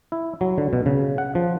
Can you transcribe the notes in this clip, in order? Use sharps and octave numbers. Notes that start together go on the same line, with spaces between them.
E4
F#3
D3
B2
C#3
F#5
F3